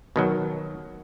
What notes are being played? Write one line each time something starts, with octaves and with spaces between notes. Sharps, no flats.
B2 D#3 F#3